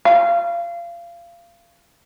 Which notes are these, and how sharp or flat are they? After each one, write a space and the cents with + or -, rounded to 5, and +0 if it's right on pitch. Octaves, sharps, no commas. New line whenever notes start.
F5 -25